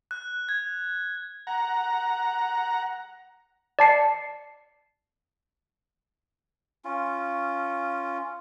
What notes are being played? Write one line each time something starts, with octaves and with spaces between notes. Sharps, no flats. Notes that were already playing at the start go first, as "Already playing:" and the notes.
F#6
G#6
F#5 A#5
D5 A5 C7 C#7
C#4 F4